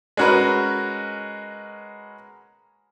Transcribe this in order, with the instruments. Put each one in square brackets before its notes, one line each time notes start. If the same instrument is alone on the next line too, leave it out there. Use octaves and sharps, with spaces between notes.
[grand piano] G#3 C#4 F#4 A#4 B4